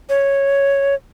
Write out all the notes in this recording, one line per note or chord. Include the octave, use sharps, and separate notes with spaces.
C#5